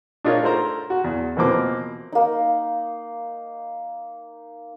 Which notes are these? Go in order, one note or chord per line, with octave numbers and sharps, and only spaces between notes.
D4 D#4 F4 A#4 C#5 D#5
A4 A#4 C5 A#5
F#4
E2
B2 E3 F3 A#3 C4 D6
A#3 D#4